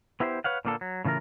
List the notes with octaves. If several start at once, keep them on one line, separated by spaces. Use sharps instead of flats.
B3 E4 G4 B4 C5
B4 C#5 F5 F#5
A#2 D3 A#3 B3 A4
F#3
A2 C#3 E3 F4 A#4